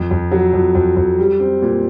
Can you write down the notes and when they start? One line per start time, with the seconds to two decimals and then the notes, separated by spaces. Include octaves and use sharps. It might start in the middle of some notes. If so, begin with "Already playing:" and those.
Already playing: F2
0.11 F2
0.31 F#3
0.54 F2
0.75 F2
0.96 F2
1.18 G3
1.40 C4
1.62 A#2